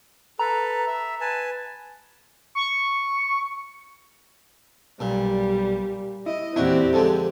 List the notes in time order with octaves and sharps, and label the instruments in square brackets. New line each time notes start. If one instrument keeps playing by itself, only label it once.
[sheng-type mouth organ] A4 B4 [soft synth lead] A#5
[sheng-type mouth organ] E5
B4 G#5 A5
[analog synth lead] C#6
[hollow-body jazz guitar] B1 [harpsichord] A#2 [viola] G3
[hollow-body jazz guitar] E4 [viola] D#5
[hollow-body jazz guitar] E2 A#2 E4 [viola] C4 G4 [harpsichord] D4 F#4
[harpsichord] F2 D3 G#3 [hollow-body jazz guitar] A4